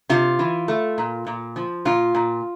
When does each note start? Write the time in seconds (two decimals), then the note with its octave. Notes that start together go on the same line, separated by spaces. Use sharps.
0.09 C3 F4
0.39 E3
0.68 A3
0.98 A#2
1.27 A#2
1.56 F3
1.85 A#2 F4
2.15 A#2